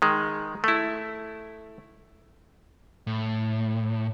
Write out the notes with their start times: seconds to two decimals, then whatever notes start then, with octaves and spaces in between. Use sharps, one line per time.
0.02 D#3 G#3
0.64 A3 E4
3.07 A2